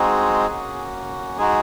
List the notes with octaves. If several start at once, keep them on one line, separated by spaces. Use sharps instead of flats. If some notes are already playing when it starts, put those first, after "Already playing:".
Already playing: G#3 C4 D#4 F#4 G#4
A#3 C#4 F#4
G#3 D#4 F#4 G#4